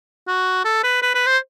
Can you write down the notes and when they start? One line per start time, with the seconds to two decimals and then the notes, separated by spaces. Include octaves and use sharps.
0.27 F#4
0.65 A4
0.83 B4
1.02 B4
1.15 B4
1.26 C5